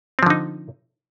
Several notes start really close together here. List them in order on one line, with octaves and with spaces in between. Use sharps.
C4 F3 D3 D#4